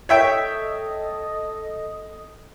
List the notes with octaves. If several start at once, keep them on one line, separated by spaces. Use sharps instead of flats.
A4 C#5 D#5 E5 G5 D#6